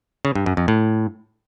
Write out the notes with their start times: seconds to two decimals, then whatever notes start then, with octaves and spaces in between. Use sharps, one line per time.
0.25 C#3
0.35 G2
0.46 F#2
0.57 F2
0.68 A2